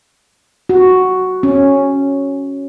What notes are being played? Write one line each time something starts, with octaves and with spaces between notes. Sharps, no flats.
F#4
C#4